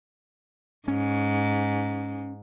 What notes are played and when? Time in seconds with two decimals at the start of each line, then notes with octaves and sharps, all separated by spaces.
0.88 G#2 C#4